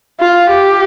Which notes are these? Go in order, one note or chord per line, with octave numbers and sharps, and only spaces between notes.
F4
G4